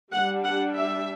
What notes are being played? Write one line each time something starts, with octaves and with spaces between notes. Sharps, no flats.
G3 D4 F#5
F#5
E5